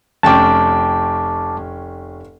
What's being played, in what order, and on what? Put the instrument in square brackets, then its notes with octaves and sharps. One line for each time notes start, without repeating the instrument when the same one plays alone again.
[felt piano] F1 C#4 G5 [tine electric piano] A5 D6